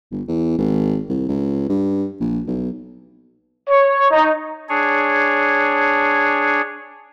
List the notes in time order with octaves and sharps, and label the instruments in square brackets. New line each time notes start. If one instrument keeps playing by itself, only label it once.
[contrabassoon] G1
E2
G#1
C2
C#2
G2
A#1
B1
[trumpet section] C#5
D#4
[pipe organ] D4 G#4 C#5